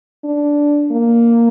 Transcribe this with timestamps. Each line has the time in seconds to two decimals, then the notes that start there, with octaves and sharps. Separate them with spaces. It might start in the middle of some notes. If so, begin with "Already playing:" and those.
0.24 D4
0.92 A#3